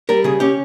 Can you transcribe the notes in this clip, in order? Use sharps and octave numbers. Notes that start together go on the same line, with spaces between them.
G3 A#4
C#3 G#4
C#4 G4